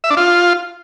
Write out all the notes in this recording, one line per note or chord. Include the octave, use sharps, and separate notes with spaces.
E5
D4
F4